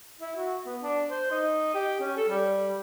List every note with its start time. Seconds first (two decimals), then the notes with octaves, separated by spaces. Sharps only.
0.20 E4
0.36 F#4
0.66 B3
0.81 D4
1.09 C5
1.31 D#4
1.74 G4
2.00 C#4
2.16 A4
2.29 G3